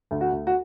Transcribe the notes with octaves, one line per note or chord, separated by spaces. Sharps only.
D2
F#4
D2
F#4